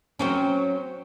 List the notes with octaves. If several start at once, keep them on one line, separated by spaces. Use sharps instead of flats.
F#3 C4 C#4